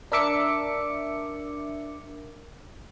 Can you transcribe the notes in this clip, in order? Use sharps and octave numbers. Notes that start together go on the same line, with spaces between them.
D4 A#4 E5 D6 C#7